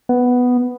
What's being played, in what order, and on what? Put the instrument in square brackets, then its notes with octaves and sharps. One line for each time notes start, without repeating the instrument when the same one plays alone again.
[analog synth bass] B3